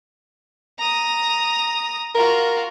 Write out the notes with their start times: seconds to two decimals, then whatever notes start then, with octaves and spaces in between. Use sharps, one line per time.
0.78 A#5 D#6
2.15 F4 F#4 A#4